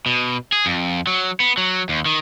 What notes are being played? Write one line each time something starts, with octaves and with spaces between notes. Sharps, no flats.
B2
G#4
F2
F#3
B3
F#3
D#2
D#3